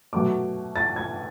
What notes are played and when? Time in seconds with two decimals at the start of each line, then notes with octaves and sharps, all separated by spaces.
0.13 B2 F#3 A3 D6
0.76 A6
0.96 G#6